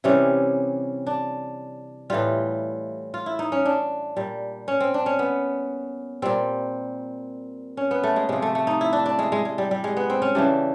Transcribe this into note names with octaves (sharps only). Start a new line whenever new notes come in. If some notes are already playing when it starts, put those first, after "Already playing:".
C3 E3 G3 C#4
D4
A2 E3 G3 F4
F4
E4
D#4
C#4
D4
A#2 G3
C#4
C4
D4
C#4
B3
A#2 G3 C4
C#4
B3
A3
G#3
C3 F3 G#3
A3
A3
D#4
E4
D4
D4
G#3
G#3
G#3
G3
G3
G#3
B3
C4
C#4
C#3 E3 G3 D4